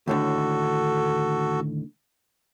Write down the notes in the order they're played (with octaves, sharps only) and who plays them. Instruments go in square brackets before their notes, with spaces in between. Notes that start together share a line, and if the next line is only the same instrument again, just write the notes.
[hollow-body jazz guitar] D#2 A2 D3 [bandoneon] F#4 A4